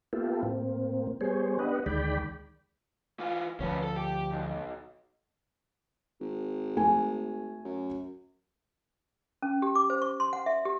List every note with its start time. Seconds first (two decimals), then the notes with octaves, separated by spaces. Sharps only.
0.13 A#3 B3 E4 F4 G4 A4
0.43 A2 A#3 C4
1.21 G3 B3 G#4 C5 C#5
1.59 B3 D4 G4 B4 D#5 F#5
1.86 D2 D#3 G#3 D5 G5 B5
3.19 E3 F4
3.60 D2 F3 C#4 B4
3.84 A4
3.96 G4
4.32 B1
6.20 G#1
6.77 A3 G#5
7.65 F#2
9.42 C#4
9.62 G4
9.75 D6
9.90 C5
10.02 C#6
10.20 C6
10.33 F#5
10.46 E5
10.65 G4